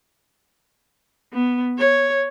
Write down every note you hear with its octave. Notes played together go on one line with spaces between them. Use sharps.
B3
C#5